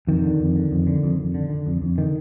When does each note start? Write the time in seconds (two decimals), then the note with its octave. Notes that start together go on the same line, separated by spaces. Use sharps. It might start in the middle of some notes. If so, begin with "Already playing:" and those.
0.07 F2 D#3
0.23 D3
0.40 F2
0.56 D3
0.71 F2
0.87 D3
1.03 F2
1.19 F2
1.35 D3
1.50 D3
1.67 F2
1.82 F2
1.97 D3 D#3